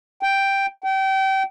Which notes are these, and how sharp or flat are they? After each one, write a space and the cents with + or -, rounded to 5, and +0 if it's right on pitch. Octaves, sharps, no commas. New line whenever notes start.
G5 +0
G5 -30